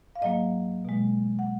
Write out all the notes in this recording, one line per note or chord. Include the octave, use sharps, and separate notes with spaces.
F5
G#2 F#3 A#3 D#5
B2 G#3
F#5